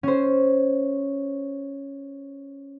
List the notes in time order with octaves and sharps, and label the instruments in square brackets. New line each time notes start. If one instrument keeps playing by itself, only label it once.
[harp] C#4 C5